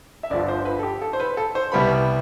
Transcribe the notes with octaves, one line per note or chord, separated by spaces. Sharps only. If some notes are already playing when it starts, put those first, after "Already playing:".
E5
G1 G2 D3 F3 D5
C5
B4
A4
G4
A4
C5
B4
A4
C5
C2 B2 G3 B3 B5